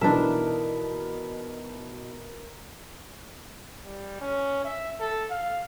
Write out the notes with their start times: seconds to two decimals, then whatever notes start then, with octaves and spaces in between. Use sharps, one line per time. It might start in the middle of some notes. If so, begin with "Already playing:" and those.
0.01 B2 E3 D4 D#4 A#4 B4 E5
3.85 G3
4.21 C#4
4.65 E5
5.00 A4
5.30 F5